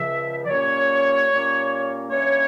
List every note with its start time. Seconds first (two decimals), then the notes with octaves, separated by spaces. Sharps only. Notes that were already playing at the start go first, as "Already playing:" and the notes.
Already playing: C#2 C#3 F3 E5
0.45 D5
0.49 A#2 G3 A#3 C#4 C#5
1.30 A#2 G3 A#3 C#4
2.10 G2 E3 A#3 C#4 C#5